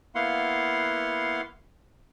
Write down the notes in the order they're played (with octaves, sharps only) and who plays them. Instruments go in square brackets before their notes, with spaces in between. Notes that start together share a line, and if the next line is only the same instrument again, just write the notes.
[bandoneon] A#3 B3 E4 F5 F#5 C6